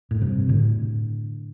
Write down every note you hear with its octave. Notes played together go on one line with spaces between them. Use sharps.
A2
G2 C3
A2 D3